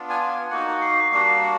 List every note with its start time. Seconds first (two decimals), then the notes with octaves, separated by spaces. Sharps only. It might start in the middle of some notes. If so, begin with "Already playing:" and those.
Already playing: B3 D4 F4
0.10 G#5
0.20 G#5
0.51 A#3 D#4 F#4 F#5
0.81 F5
1.12 G3 A#3 D4 F#4 F5
1.43 F#5